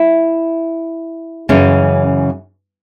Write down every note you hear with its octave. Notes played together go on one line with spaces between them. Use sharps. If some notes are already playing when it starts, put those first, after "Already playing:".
Already playing: E4
F#2 C#3 E3 C#4